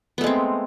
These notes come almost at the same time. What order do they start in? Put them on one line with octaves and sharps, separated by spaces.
B3 A3 G#3 C4